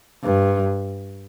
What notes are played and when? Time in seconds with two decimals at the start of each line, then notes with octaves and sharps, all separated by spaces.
0.23 G2